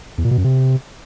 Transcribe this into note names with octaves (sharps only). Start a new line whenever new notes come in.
E2
A#2
B2
F#2
C3